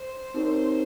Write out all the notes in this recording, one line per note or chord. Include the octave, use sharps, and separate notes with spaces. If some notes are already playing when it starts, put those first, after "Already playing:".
Already playing: C5
C4 D#4 G4 A#4 C#5